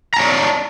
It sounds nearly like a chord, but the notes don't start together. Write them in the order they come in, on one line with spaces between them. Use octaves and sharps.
A#5 A5 C#5 D5